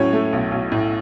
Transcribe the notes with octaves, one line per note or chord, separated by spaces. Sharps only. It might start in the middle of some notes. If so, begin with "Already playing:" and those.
Already playing: A2 F#3 C#4 C#5
A3
B1
B1
A2